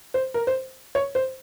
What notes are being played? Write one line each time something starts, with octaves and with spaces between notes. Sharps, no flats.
C5
A#4
C5
C#5
C5